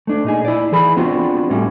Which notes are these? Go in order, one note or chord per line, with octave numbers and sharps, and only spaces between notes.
A3 D4
A#2 D#4 G#4
E4 D5
E3 G#4 B5
B3 C4 D4 F4 F#4
A2 G3 C#4